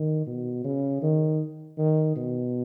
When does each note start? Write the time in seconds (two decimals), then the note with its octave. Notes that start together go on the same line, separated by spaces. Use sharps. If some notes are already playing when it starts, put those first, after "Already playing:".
Already playing: D#3
0.27 B2
0.64 C#3
1.02 D#3
1.78 D#3
2.16 B2